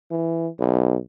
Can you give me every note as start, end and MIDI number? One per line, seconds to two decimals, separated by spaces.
0.11 0.48 52
0.60 0.97 35